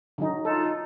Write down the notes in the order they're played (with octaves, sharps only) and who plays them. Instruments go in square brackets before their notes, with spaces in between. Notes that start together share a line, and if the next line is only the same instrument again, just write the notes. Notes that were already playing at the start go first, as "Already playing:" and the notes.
[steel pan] D3 F#3 D#4
[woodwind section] D#4 F4 [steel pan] A4